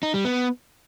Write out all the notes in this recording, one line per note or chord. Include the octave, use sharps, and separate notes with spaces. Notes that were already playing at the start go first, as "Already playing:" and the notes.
D#4
G3
B3